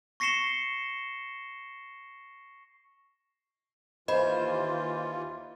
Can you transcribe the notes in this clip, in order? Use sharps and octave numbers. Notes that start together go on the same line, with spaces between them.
C#6 A#6 C7 C#7 E7 G7
D#2 E3 F4 C5 D#5 B5